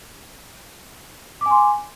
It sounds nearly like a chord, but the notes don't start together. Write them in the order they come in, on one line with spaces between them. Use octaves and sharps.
D6 G#5 C6